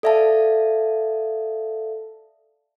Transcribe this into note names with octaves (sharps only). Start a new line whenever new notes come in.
A4 D5 E5 F5 A5